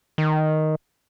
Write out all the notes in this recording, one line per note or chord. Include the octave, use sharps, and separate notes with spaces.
D#3